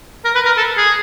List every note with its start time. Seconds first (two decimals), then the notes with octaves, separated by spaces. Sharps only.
0.24 A#4
0.35 B4
0.46 A#4
0.57 A4
0.77 G#4